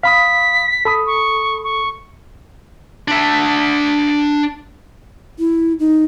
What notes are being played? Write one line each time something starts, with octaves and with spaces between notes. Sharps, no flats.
F5 B5 D#6 B6
A4 B5 D#6
C#6
C#6
D4 E5
E4
D#4